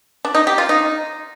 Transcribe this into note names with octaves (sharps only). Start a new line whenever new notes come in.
D4
D#4
G4
F4
D#4